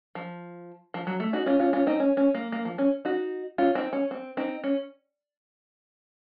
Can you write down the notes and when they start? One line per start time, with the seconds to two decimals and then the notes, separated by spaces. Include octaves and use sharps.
0.15 F3
0.94 F3
1.07 F#3
1.20 A3
1.33 D#4 F#4
1.46 C#4 F4
1.60 C#4 F4
1.73 C#4 F4
1.87 C4 D#4
2.00 C#4
2.17 C#4
2.35 A#3
2.52 A#3
2.65 F3
2.78 C#4
3.05 D#4 F#4
3.58 C#4 F4
3.75 C4 D#4
3.93 C#4
4.11 C4
4.37 C4 D#4
4.64 C#4